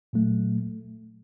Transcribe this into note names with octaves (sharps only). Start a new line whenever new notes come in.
A#2 F#3 A3